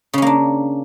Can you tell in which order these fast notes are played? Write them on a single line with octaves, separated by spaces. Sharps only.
C#3 C#4 A#3 D4